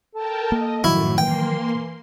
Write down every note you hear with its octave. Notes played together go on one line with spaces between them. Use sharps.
A4 A#4 G5 A5
A#3 D#5
F#2 A2 D#3 F3 F#3 E4 F#4
E3 A#3 G5 C6
E3